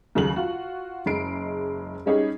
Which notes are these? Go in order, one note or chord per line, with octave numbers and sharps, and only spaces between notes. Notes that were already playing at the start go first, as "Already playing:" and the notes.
D#2 C#3 F#3 F#7
F4 F#4
F#1 G#3 C7 D7
G3 G#3 C#4 D#4 G4 G#4